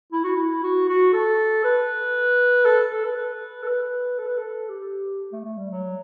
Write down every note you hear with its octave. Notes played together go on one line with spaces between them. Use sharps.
E4
F#4
E4
F#4
F#4
A4
B4
A4
A4
B4
B4
A4
B4
A4
B4
A4
G4
A3
A3
G3
F#3